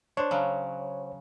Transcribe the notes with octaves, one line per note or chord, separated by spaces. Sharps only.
D4 C5 C#5
C#3 F#3